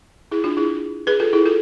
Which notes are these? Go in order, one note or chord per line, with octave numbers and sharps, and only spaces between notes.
E4 G#4
D4 F4
E4 G#4
G#4 B4
F4 A4
E4 G#4
F4 A4